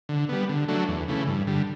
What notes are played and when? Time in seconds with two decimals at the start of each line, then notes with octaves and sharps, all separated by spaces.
0.09 D3
0.29 G3 B3
0.49 D3
0.68 F#3 A3 D4
0.88 E2
1.08 C#3 E3 A3
1.27 G2
1.47 D3 G3